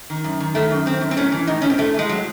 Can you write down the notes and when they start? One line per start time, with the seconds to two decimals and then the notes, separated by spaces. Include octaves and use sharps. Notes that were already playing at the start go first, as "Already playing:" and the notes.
0.10 D#3
0.24 F#2
0.40 D#3
0.55 D#3 A3
0.71 F#2
0.86 D#3 C4
1.01 F#2
1.11 C4
1.17 A2 C#4
1.32 E3
1.47 A2 D#4
1.62 A2 C#4
1.70 C4
1.78 A2 A3
1.94 A2 G#3
2.09 A2 F#3